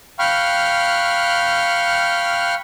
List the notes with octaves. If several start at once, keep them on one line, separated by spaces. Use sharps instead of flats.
F5 G5 B5 C#6 F6 F#6